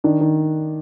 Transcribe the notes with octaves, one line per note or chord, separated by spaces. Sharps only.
D#3 D4
D#3